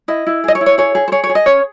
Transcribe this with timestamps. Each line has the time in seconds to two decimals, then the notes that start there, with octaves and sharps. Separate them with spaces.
0.08 E4 D#5
0.27 E4
0.44 G#4 D#5
0.55 C#5
0.61 E4
0.66 C#5
0.78 G#4 C#5
0.95 G#4
1.08 C5
1.12 G#4 C#5
1.24 C#5
1.29 G#4
1.35 D#5
1.46 C#4 C#5